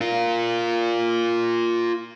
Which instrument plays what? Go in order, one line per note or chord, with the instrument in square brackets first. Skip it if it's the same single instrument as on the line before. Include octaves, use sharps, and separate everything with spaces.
[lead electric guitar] F4 A#4